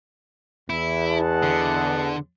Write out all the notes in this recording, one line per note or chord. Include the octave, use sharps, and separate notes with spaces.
E2 E4
D#5 F#5 A5
D3